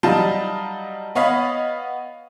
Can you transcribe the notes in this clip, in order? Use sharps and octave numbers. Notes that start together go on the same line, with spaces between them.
F#3 G3 D#4 F5 A5
B3 C#5 D#5 F5 B5